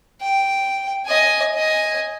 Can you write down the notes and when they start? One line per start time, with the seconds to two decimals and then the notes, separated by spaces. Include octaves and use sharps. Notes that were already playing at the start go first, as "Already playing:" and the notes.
0.21 G5
1.06 D#5 G#5
1.54 D#5 G#5